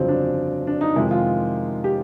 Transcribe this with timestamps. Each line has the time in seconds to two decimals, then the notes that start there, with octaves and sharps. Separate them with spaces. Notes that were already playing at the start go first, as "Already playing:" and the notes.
Already playing: G1 F2 C#3 F#3 C4
0.08 D4
0.67 D4
0.81 D#4
0.96 F2 C3 D#3 G#3 E4
1.11 F4
1.84 G4